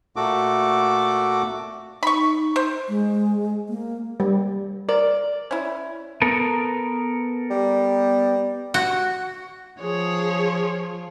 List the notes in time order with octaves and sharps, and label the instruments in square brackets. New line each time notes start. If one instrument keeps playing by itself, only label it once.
[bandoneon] A#2 A3 F#4 A4 D6
[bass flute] D#4 [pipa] B5 C#6
[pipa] C5
[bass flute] G#3
A#3
[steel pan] G3
[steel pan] A#4 [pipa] D5
[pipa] C#4 E4
[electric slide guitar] B3 A4 A#4
[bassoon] G3
[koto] F#4
[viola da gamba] F3 [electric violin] G#4 C#5